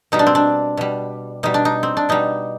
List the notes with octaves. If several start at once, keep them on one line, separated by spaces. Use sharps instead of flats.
B2 G3 D#4
D4
C4
D4
B2 G3
B2 G3 D#4
D4
D#4
C4
D4
B2 G3 D#4